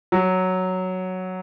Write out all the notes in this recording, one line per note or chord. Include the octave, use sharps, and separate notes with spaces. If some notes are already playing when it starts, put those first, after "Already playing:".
F#3